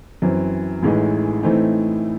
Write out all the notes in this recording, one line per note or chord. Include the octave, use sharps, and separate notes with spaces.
F#2 E3 C4
A1 A2 E3 G#3 D#4
A2 E3 A3 C4 D#4